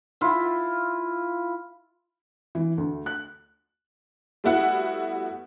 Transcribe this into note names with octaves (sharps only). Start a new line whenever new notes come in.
E4 F4
E3
D2
F#6
G3 A3 B3 E4 F#4 F#5